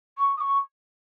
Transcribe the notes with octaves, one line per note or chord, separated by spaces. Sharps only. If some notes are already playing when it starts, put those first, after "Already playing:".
C#6
D#6
C#6